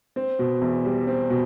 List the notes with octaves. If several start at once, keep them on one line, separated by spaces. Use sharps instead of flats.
C4
B2
E2
G3
C4
B2